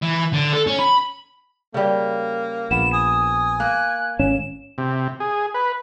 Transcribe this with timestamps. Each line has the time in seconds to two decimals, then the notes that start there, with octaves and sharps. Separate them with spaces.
0.02 E3
0.33 D3
0.53 A4
0.67 C#4
0.79 B5
1.74 C#3 G3 A#3
2.71 A#1 B3 E7
2.93 G#5 D#6
3.60 A#3 F#6
4.19 G#1 A2 C#4 E7
4.78 C3
5.20 G#4
5.54 B4